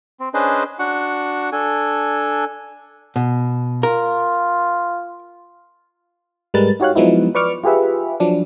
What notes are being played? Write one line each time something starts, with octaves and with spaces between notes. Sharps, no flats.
C4
C#4 D4 G#4 B4 C5 D#5
D4 F#4 F#5
D4 A4 G#5
B2
F4 A#4
G#2 G3 G#3 A#4 B4 A6
D#4 F#4 G4 C#5 F5 F#6
F3 F#3 G#3 B3 D#4 E4
B4 D5 C#6 D6 F6
F4 G4 G#4 B4 E5
F3 F#3 D4